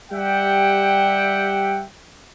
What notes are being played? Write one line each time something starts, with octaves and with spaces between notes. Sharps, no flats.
G3 G4 E5 F#5 G5